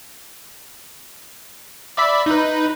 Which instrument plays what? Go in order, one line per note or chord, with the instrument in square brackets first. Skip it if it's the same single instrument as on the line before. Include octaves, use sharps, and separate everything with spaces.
[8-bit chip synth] D5 E5 B5
D#4 B4